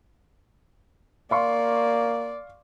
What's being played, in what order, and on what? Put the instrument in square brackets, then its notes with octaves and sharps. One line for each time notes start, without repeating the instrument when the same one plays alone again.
[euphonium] A#3 [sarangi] D5 [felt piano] F5 C6 C#6